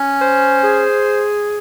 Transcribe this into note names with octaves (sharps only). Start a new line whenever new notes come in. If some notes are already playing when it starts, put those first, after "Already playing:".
Already playing: C#4
C5
G#4